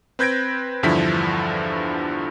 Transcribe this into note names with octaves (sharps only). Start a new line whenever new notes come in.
C4 B4 G6 G#6 A#6 D7
E2 G2 D3 F3 E4 B6